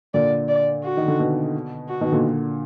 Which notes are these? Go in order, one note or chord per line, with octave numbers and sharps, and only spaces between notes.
A#2 D3 D5
D5
F#4
D#3
D3
B2
F#4
B2 D#3
A#2 D3